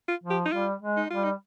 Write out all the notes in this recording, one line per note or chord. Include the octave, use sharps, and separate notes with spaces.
F4
F3
G4
D#4
G3 F4
G#3
D#4
G3 F4
D#4